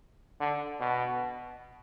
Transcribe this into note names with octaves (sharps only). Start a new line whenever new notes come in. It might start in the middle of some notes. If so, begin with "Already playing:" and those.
D3
B2